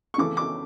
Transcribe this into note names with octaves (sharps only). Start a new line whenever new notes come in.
C#6
C#3 E3 A3 D6
D6